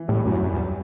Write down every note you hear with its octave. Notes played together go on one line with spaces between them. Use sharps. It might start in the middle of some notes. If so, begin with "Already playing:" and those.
Already playing: E3
A2 G3
F#2 F#3
F#2 G3
E2